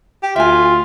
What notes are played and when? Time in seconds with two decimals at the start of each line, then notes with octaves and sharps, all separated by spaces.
0.23 G4
0.36 D2 F4 E5 G#5